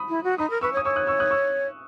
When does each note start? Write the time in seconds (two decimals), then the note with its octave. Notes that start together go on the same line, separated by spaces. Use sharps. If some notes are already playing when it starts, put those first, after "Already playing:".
Already playing: B5 D#6
0.09 E4
0.24 F#4
0.38 D#4 B5 D#6
0.50 A#4
0.61 B4 C#6 E6
0.73 C#5
0.77 D#6
0.84 C#5 C#6 E6
0.96 D#6 F#6
1.07 C#6 E6
1.20 D#6 F#6
1.31 C#6 E6